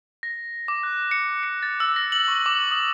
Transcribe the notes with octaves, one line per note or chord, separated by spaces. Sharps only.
A#6
D6
F#6
C#7
C#7
A6
E6
A#6
F#7
C#6
D6
D#6